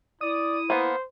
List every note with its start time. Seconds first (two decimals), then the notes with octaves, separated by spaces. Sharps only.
0.21 E4 D5 D#6
0.70 A#3 B3 C5